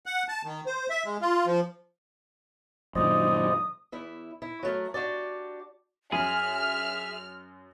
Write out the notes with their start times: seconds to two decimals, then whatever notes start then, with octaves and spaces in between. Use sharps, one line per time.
0.06 F#5
0.28 A5
0.45 D#3
0.66 C5
0.90 E5
1.05 G#3
1.21 F4
1.46 F3
2.95 F#2 A#2 D#3 C5 D5 D#5 D#6
3.92 E2 E4 E5
4.42 E4
4.63 F#3 A3 A#4
4.94 D4 F#4 G4 D5
6.12 F#2 G#4 E5 F6